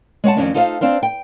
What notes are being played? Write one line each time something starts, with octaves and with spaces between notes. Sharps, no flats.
G#3 C#5 F#5 A5
F2 D#3 C#4 D4
D#4 F4 A4 C5 D#5 F5
C4 D4 C5 F5
G5